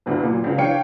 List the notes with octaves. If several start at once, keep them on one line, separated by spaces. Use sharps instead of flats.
G1 D2 G2 B4
A#2 F#3
C#2 C#3
E3 D4 C#5 F5 G5 C#7